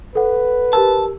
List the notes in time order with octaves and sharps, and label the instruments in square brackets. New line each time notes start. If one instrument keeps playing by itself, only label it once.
[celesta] A4 F#5 [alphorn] B4
[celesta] G4 A#4 E6 [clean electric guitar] A5